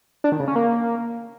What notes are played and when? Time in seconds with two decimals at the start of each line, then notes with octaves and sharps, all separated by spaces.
0.24 D4
0.32 D#3
0.40 C#3
0.48 C#4
0.55 A#3